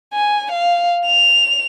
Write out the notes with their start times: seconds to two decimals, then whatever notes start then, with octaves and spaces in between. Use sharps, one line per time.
0.14 G#5
0.52 F5
1.06 F7